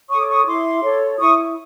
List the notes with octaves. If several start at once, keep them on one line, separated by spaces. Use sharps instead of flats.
A4 C#5 C#6 D#6
D6
C#6 D#6
E4 C6 D6
A4 C#5
E4 C#6 D#6